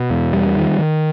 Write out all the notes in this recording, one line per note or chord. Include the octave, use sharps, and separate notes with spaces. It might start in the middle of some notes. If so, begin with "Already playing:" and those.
Already playing: B2
E2
G3
D#3
D#3